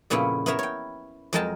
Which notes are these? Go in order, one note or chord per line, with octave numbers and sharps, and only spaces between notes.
F2 A#2 C#3 B3 C#4 E4
B3 E4 A#4 C#5 E5 A#5
C#5 G5
F2 F#3 G#3 A#4 G5 A5